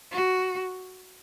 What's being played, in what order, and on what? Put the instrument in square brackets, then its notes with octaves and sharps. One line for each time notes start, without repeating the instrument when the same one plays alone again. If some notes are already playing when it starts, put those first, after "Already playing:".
[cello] F#4